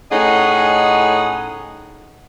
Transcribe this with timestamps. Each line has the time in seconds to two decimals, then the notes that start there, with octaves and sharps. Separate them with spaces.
0.12 A2 C#4 D#4 G#4 D#5 F#5